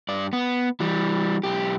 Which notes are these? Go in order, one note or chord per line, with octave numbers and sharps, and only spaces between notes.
G2 D5
B3
E3 G3
B1 G4